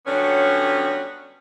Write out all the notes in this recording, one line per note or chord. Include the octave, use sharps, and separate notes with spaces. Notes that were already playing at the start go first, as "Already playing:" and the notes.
D3 F#3 G3 B3 C#4